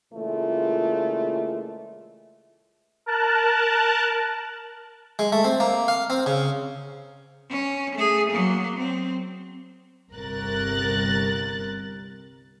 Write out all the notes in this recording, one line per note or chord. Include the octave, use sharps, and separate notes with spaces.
A#2 C#3 E3 G#3 A3 F4
A#4 A5 F#6
G#3
A3
C4
A#3
F5
C4
C#3
C#4
A3 G#4
F#3 A#3
C4
G1 C2 A#4 F#6 A6